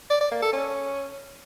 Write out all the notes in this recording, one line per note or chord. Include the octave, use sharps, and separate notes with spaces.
D5
D5
A#3
A4
C#4